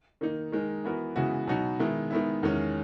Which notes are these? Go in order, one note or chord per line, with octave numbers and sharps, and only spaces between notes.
D#3 A#3 D#4
D#3 G#3 D#4 A#4
E3 B3 F#4 A#4
C#3 E3 G#3 B3 F#4
B2 F#3 B3 D#4 F#4
D#3 G#3 B3 E4
D#3 G#3 B3 E4
E2 D#3 G#3 C#4